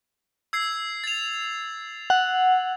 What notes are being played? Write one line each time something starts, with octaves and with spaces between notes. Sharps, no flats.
E6 G#6 C7
A6 F7
F#5